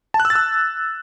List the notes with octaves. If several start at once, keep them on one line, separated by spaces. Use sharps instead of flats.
A5
F#6
E6
A6
E6